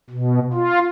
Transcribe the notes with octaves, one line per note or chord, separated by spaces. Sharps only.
B2
F4